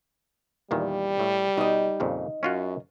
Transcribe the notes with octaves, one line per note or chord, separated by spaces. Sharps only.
E2 A#2 D#3 G3
A2
B2 D#4 D#5
F2 A#2 C#3
F#2 C#4 F4 F#4